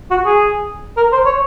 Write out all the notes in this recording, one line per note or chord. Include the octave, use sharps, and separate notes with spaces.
F#4
G#4
A#4
C5
C#5